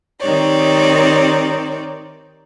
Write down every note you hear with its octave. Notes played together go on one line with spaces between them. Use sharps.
D#3 C4 D#4 G4 C#5 D5